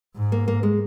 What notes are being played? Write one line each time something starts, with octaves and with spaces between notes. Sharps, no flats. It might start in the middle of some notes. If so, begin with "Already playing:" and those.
G#2
A#3
A#3
G#3